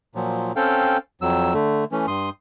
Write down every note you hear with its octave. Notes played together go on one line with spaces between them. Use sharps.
A#2 F3 F#3
C4 C#4 A4 F5 G5
F2 F#3 E6
D3 A3
E3 A3 C#4
G2 C6 D#6